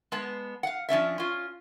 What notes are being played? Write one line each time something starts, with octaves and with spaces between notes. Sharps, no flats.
G#3 B3 A5
F5 F#5
F3 C#4 D4 E5
C#4 F4